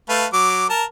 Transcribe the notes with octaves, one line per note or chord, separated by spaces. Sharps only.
A3 B4 F5
F#3 D6
A#4 A5